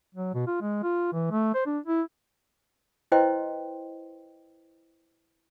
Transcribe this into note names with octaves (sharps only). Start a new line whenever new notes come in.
F#3
B2
F4
G#3
F4
E3
A3
C5
D4
E4
E4 B4 C5 D#5 G5 C6